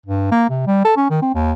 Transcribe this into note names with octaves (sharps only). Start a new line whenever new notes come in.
G2
A#3
C3
G3
A4
C#4
D#3
C4
D#2